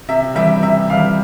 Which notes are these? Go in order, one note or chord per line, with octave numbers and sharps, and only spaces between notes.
C3 E5
E3 G3 E5
C3 E5
E3 G3 F5